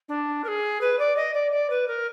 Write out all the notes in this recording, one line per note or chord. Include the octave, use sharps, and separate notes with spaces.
D4
A#4
G#4
B4
D5
D#5
D5
D5
B4
A#4